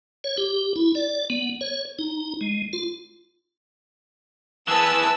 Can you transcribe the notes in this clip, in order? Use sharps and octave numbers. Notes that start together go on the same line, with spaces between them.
C#5
G4
E4
D5
B3
C#5
D#4
G#3
F4
E3 G#4 B4 A5 E6